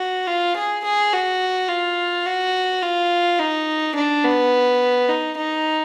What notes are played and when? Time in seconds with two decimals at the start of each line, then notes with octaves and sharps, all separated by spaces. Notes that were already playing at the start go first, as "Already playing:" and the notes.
Already playing: F#4
0.27 F4
0.56 G#4
0.84 G#4
1.12 F#4
1.68 F4
2.25 F#4
2.83 F4
3.39 D#4
3.95 D4
4.24 B3
5.09 D#4
5.37 D#4